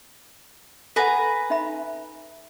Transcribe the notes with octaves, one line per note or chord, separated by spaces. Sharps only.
A4 B4 F#5 G#5 A#5
D#4 E5 B5